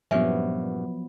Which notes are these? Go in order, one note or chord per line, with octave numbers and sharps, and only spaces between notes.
G2 A#2 F3 F#3 B3 C#4 E5 G#5